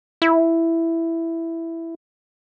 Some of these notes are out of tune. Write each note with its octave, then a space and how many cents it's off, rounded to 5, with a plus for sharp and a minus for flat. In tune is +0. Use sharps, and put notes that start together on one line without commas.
E4 +5